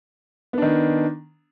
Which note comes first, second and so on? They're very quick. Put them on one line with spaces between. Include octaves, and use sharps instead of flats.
B3 D4 D#3